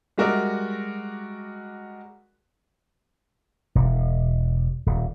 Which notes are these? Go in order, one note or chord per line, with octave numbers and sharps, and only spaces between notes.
G3 G#3 F#4 A#4 D5 E5
E1
D#1